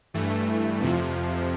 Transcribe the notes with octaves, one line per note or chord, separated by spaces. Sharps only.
G2 E3 A3
F2 C3 F3